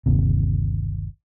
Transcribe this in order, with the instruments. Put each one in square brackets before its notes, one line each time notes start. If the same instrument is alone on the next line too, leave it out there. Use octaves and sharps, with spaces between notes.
[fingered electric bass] G1 D#2 C3